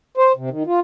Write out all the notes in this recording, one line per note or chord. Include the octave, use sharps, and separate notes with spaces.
C5
C3
D#3
F4